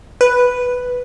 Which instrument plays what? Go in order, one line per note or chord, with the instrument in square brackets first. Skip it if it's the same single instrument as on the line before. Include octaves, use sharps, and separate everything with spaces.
[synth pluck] B4